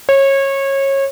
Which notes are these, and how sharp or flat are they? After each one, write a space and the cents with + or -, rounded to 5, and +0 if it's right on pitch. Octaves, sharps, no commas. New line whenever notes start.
C#5 -25